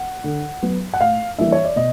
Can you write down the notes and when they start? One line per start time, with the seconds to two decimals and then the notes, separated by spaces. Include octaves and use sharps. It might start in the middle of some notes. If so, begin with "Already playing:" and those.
Already playing: F#5
0.24 D3
0.62 F#3 B3
0.94 F#5
1.00 A2 F5
1.38 E3 G3 A#3 D4 E5
1.52 C#5
1.65 D5
1.76 B2 D#5